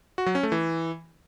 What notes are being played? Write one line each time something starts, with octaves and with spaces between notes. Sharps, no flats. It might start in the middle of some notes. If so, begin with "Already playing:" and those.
F#4
F#3
C#4
A3
E3